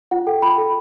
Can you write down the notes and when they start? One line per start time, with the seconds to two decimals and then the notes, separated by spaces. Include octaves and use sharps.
0.11 F4 F#5
0.27 A4 G5
0.42 F4 B5
0.58 A4